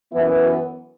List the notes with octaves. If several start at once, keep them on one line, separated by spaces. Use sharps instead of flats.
F#2 E3 B3 E4
F#4